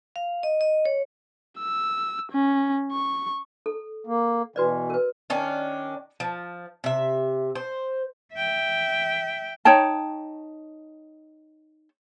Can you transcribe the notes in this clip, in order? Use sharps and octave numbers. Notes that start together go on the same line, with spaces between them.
F5
D#5
D#5
C#5
E6
C#4
C#6
A4
A#3
B2 E3 F#4 B4 D5
A#4 B4
D#3 C#4 D4
F3
C3 E5
C5
E5 G5
D#4 C#5 G5 A5